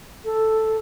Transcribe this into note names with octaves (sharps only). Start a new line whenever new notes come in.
A4